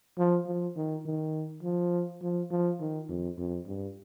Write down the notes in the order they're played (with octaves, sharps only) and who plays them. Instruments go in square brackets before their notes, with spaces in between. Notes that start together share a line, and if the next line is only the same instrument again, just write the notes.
[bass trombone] F3
F3
D#3
D#3
F3
F3
F3
D#3
F2
F2
G2